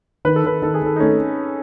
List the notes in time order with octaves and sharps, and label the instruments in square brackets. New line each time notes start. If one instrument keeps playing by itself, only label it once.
[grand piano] D#3 [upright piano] B4
[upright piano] A4
[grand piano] D#3 [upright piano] B4
[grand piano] D#3 [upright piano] A4
[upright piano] G#4
[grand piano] D#3 [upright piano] A4
[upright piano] D#4
[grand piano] A3 [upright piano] C#4